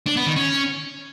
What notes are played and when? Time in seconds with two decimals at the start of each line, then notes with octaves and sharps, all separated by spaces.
0.07 D4
0.16 B3
0.26 D#3
0.36 C#4